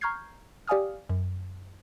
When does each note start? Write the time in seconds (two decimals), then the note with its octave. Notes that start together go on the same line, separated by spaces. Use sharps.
0.01 A#5 C#6 F6 G6 G#6 C7
0.68 G4 D5 F5 G#5 D#6 F6
1.09 F#2